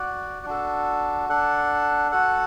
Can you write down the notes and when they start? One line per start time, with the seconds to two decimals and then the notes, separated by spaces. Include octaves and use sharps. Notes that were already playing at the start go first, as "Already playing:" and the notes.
Already playing: F#4 D5 F#5
0.46 D4 F#4 A4
1.29 D4 A4 F#5
2.11 F#4 A4 F#5